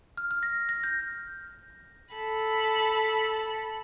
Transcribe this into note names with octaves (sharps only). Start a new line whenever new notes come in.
F6
F6
A#6
A#6
G6
A4 B5